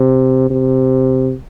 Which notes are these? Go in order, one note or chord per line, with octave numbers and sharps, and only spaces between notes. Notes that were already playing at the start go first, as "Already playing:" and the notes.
Already playing: C3
C3